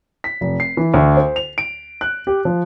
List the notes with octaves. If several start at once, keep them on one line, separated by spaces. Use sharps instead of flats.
B6
F1
C7
E3
D2
C5
F7
D7
F#6
G4
F3